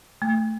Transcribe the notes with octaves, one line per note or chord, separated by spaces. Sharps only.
A3